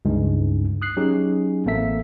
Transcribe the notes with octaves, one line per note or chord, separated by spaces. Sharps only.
C#2 G2 G#3 D#4
D#6 F#6 C7
F#3 C#4 D#4 G4 G#4
A1 A#3 C4 A4 E5 B6